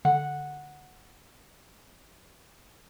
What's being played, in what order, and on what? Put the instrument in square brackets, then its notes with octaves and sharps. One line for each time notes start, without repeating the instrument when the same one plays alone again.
[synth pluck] D3 [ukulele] F#5